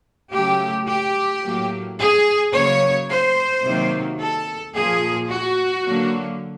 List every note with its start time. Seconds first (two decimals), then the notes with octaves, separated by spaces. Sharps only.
0.32 C#3 F#3 A3 G4
0.87 G4
1.43 A2 F#3 A#3
1.98 G#4
2.53 C#3 F#3 A#3 C#5
3.08 C5
3.63 C3 D#3 F#3 A#3
4.19 A4
4.75 A#2 F3 A#3 G#4
5.29 F#4
5.86 D3 F#3 A#3